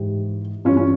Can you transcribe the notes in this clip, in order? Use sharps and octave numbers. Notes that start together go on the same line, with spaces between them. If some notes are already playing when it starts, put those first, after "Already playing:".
Already playing: G#2 E3 E4 G4
G2 E3 C#4 F4
C#4